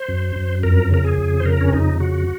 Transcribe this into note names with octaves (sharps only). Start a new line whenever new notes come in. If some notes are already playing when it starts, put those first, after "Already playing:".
Already playing: C5
F#2
F#2
F2 A#4
C#3 A#4
G#4
F2
C5
C#3 A#4
C#4
F2 D#4
C#3 F#4